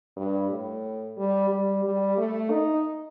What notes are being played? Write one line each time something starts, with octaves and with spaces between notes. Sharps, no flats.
G2
A2
G3
G3
G3
A3
D#4